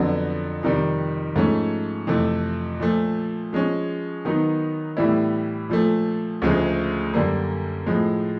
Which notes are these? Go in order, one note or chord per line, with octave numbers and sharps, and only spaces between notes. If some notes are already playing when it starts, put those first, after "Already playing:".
Already playing: F2 D3 F#3 B3 D4
F2 C3 D#3 G3
G#2 F3 A3 C#4
F2 C3 E3 A3
A#2 F3 A3
F3 G#3 C#4
D#3 F#3 B3 D#4
A2 E3 G3 B3 E4
A#2 F3 A3
D2 C#3 F3 G#3
F#2 D3 G3 A#3
A2 F3 G#3